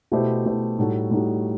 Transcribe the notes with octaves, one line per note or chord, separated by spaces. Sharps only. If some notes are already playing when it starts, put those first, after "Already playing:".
B2 A3 E4 G4 C5
B2 A3 E4 G4 C5
A2 G3 D#4 F#4 A4
A2 G3 D#4 F#4 A4